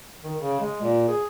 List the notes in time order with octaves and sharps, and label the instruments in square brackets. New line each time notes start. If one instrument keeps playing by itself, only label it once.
[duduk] D#3
C#3
G#3
A#2
G#4